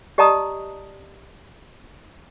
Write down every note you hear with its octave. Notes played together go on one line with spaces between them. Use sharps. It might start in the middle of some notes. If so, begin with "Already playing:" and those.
G4 D5 D#5 A5 A#5 D#6